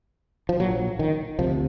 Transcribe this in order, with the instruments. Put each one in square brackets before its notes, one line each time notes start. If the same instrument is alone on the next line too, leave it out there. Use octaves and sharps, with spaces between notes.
[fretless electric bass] F3
A#1 A#2 F#3
D#3
D2 C3 F3